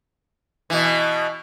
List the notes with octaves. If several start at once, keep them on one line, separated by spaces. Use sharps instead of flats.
B2 E3